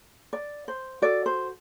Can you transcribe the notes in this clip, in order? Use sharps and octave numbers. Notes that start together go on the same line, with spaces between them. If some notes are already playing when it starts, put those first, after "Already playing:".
D5
C5
F#4 A4 D5
C5